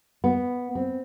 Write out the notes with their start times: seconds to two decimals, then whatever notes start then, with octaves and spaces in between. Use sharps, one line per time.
0.24 B3
0.75 C4